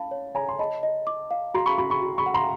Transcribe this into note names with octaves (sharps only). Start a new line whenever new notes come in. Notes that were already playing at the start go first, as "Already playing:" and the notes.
Already playing: F5 A5 B5
C#5
C#5 G#5 A#5
C6
D#5 A5 B5
D#5
D6
F5
F#4 A#5 C6
B5 C#6
F#4 B5 C#6
B5 C#6
F#4
B5 C#6
F#5
A#5 C6